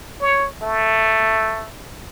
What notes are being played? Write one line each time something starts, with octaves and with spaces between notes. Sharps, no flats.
C#5
A3